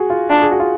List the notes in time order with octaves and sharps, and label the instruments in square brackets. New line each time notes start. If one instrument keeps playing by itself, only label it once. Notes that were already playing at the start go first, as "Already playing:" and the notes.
Already playing: [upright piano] F#4 G#4
F4
[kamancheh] D4 [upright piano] F4
[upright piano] G#4
F#4
F4